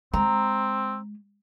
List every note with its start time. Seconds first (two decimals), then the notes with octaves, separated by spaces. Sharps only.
0.13 G#3 C4 A#5